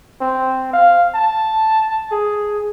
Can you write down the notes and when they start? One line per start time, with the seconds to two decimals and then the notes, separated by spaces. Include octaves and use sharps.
0.21 C4
0.74 F5
1.15 A5
2.12 G#4